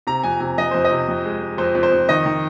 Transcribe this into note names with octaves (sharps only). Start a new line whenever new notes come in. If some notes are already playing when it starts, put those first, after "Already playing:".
C3 A#5
F2 G#5
C3 G#5
F2 D#5
F2 C5
D#5
C3
F2
G#3
G#3
F2 C5
F2
C5
F2
D#3 D#5
D#3